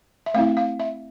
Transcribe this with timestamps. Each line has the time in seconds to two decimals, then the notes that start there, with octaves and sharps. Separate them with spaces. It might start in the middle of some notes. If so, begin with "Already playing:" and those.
0.26 E5
0.34 A3 C4 E4 F5
0.57 F5
0.80 E5